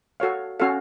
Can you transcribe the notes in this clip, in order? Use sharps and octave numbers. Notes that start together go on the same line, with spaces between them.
F#4 A4 C#5 F5
C#4 F#4 A4 F5